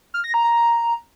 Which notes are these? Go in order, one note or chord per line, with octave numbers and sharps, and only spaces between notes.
F6
A#6
A#5
A#5